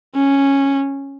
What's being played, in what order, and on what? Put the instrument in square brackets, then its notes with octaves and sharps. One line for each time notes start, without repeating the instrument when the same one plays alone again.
[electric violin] C#4